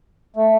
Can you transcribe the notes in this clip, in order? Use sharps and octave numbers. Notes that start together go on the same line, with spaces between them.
A3